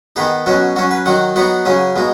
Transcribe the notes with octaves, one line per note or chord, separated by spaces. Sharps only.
D#3 B3 D#4 G#4
B2 F#3 C#4 F#4
F#3 C#4 F#4
B4
D#3 F#3 D#4 F#5
F#3 B3 D#4 F#5
C#3 F#3 C#4
B2 G#3 D#4